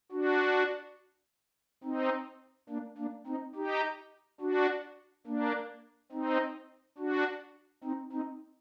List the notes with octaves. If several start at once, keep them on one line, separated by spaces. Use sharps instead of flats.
D4 F#4
C4 D#4
A#3 D4
A#3 D4
C4 D#4
D#4 G4
D4 F#4
A#3 D4
C4 D#4
D4 F#4
C4 D#4
C4 D#4